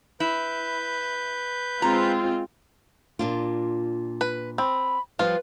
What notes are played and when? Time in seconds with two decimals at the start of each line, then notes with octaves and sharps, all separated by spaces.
0.20 E4 B4 G6
1.82 G#3 C4 F4 A#5
3.19 A#2 D4 F4
4.21 B4
4.58 C4 B5
5.19 F3 G3 F4 B4